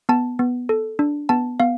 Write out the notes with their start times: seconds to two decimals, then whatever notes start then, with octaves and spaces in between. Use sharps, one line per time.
0.09 B3 A5
0.39 B3
0.69 A4
0.99 D4
1.29 B3 A5
1.60 B3 F5